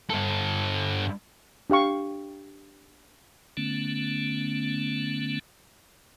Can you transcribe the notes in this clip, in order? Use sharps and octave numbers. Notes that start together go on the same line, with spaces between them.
G2 A4
D4 G4 F5 C#6
D3 A3 B3 C#4